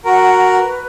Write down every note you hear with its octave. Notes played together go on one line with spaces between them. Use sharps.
F#4 A#4 F#5
A#5
B4